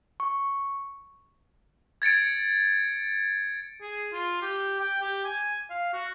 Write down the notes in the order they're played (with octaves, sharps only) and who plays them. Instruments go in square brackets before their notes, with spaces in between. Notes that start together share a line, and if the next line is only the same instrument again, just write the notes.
[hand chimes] C#6
[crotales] G#6 A6 C#7 D7
[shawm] G#4
F4
G4
G5
G4
G#5
F5
F#4